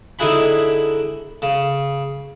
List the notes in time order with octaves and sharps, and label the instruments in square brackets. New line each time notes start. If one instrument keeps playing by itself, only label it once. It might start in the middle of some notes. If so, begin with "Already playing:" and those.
[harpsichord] D3 D#4 E4 G#4 F#5 B5
C#3